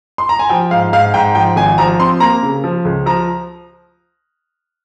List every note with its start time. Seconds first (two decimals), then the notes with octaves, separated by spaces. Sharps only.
0.18 C6
0.29 A#5
0.39 G#5
0.49 F3 G5
0.71 G#2 F5
0.93 G#2 F5
1.14 G#2 G5
1.35 F3 G5
1.56 G#1 G#5
1.78 F3 A#5
1.99 C4 C6
2.20 A#3 A#5
2.43 C#3
2.64 F3
2.85 C#2
3.06 F3 A#5